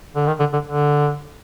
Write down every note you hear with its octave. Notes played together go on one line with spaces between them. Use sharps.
D3
D#3
D3
D3
D3